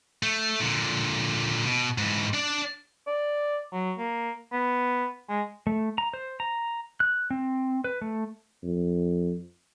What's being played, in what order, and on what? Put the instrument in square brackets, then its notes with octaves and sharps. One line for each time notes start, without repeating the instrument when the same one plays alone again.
[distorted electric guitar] A3
A#2 D3
B2
G#2 E3
D4 D5
[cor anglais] D5
F#3
A#3
B3
G#3
[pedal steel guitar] A3
A#5
C5
A#5
F#6
C4
B4
A3
[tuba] F2